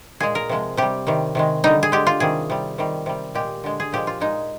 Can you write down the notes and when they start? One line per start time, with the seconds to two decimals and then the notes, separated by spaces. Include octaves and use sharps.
0.20 A#2 G#3 G#4
0.35 A#4
0.49 C3 F3 G#3
0.77 C3 G3 G4
1.07 C3 D#3 G3
1.35 C3 D#3 G#3
1.64 D3 G3 D#4
1.83 G#4
1.92 D3 G#3 G4
2.07 F4
2.20 C3 D#3 G3 G#4
2.50 C3 G3
2.78 C3 D#3 G3
3.06 C3 G3
3.35 A#2 G#3 G4
3.64 D3 G#3
3.80 G#4
3.92 A#2 F3 G#3 G4
4.07 F4
4.20 A#2 G#3 D#4